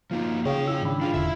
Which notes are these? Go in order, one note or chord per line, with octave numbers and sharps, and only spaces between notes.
F3 A#3 D#4 F4
C#3 F4 G#4 C#5 F5 G5
E4 G#4 E6
G#2 D#3 D4 B5
D4 F4 G#4
E1 D3 E4 E5